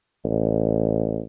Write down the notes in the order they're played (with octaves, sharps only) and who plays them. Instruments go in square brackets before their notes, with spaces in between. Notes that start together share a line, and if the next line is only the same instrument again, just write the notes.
[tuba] A1